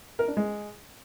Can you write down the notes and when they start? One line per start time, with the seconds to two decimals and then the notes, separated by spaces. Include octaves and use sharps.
0.19 A#4
0.28 D4
0.37 G#3